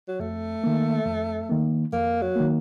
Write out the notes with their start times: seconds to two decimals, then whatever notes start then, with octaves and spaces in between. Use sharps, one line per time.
0.08 F#3
0.20 F2 A3
0.64 D#3 A#3
1.06 F2
1.49 D#3 A#3
1.92 F2 A#3
2.22 F#3
2.36 D#3 A#3